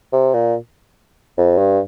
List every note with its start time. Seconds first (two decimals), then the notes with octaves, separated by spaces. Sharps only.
0.12 C3
0.34 A#2
1.38 F2
1.58 G2